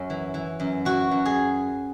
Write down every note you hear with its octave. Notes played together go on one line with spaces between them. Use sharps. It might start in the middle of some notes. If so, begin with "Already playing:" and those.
Already playing: F#2 C#4
E3
E3
F#2
E3 F#4
F#2
G#4